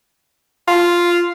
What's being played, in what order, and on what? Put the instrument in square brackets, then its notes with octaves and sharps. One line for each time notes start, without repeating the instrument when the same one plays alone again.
[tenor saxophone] F4